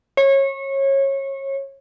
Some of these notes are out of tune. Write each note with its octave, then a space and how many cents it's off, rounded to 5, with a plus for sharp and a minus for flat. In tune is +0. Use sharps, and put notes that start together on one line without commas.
C#5 -25